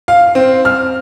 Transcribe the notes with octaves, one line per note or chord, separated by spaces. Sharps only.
F5
C4
F6